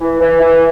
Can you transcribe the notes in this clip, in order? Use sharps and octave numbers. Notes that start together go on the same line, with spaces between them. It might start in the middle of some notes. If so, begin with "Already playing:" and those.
E3
E3
E3